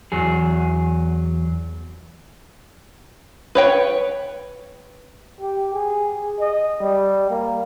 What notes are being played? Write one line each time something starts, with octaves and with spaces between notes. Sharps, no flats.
E2 F#3 G#4
B4 C#5 G5
G4
G#4
D#5
G3
A#3